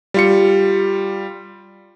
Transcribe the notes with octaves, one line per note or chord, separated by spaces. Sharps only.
G3 F4 C#7